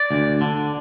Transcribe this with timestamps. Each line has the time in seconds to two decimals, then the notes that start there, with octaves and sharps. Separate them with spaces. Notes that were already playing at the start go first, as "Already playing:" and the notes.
Already playing: D5
0.11 D2
0.41 D3